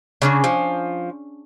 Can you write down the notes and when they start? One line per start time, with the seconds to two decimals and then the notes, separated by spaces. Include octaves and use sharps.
0.22 C#3 C#4 D4 G#4
0.44 F3